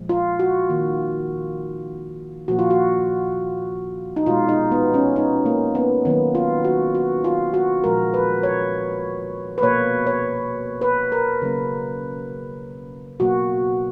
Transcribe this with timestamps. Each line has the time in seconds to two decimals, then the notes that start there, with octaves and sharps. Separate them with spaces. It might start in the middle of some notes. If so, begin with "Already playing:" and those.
Already playing: A#2 F3 G#3
0.09 F4
0.39 F#4
0.70 D#3 A#3
2.48 A#2 F3 A#3 F#4
2.59 F4
2.71 F#4
4.16 D#4
4.26 B2 G#3 F4
4.49 D#4
4.72 B3
4.94 C#4
5.16 D#4
5.46 A#3
5.75 B3
6.05 D#3 F#3 A#3 B3
6.35 F4
6.65 F#4
6.95 F#4
7.24 F4
7.54 F#4
7.84 A#2 F3 G#3 A#4
8.14 B4
8.43 C#5
9.58 B4
9.62 B2 A#3 C#5
10.07 C#5
10.82 B4
11.12 A#4
11.42 C#3 F#3 A#3
13.20 B2 F#3 A#3 F#4